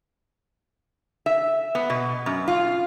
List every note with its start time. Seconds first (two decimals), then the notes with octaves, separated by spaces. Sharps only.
1.26 E5
1.75 B3
1.90 B2
2.26 F#2
2.48 F4